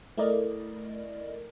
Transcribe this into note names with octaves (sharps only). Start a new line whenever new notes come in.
A3 E4 A#4 D5 D#5